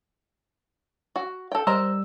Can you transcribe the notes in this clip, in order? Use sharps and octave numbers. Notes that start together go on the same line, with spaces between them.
F#4
A4 G5
G3 A#4 C5 D#5 E6